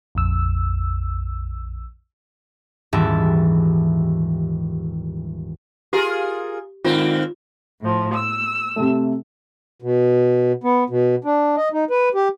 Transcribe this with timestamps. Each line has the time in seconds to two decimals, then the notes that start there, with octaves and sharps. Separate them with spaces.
0.15 A#1 F2 E6
2.93 D#1 G#2 E3 G3 E5 A5
5.93 F4 G4 G#4 A#4
6.85 G#2 D#3 A#3 C4 F4
7.80 A2 F3
8.12 E6
8.76 C3 A3
9.82 B2
10.64 B3
10.90 B2
11.25 D4
11.57 D#5
11.73 D#4
11.90 B4
12.15 G4